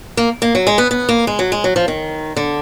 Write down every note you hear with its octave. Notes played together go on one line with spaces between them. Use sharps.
A#3
A#3
F#3
G#3
B3
B3
A#3
G#3
F#3
G#3
F#3
F3
D#3
D3